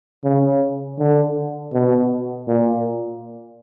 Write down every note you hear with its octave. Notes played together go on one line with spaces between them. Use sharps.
C#3
D3
B2
A#2